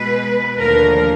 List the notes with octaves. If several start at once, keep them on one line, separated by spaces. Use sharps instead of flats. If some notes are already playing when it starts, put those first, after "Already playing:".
Already playing: B2 G#3 B4
D#2 D3 F3 A3 A#4